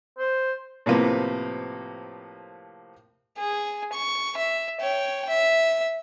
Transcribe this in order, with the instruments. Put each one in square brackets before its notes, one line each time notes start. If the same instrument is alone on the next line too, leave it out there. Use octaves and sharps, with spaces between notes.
[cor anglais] C5
[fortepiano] A2 C3 F3 A#3 B3
[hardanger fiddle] G#4
C#6
E5
C#5 G5
E5